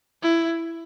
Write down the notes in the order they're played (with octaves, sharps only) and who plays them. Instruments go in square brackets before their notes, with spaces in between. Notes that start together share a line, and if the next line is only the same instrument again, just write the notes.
[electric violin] E4